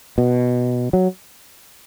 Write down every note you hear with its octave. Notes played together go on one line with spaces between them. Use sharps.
B2
F#3